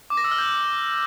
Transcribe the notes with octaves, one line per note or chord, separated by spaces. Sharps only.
D6
A#6
E6
F6
G6